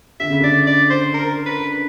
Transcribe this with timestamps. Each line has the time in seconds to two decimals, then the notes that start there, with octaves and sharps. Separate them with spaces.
0.20 D3 E5
0.30 C#3
0.40 D3 D5
0.67 D5
0.90 C5
1.14 A#4
1.46 B4